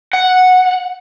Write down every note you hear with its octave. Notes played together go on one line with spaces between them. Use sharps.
F#5